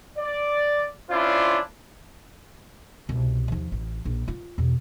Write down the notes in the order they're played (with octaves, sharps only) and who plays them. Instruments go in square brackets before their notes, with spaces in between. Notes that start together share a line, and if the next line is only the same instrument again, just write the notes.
[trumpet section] D5
C#4 D4 E4 F4 C5 D5
[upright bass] C2 B2
D#2 F3
A1
A#1
F4
E2 B2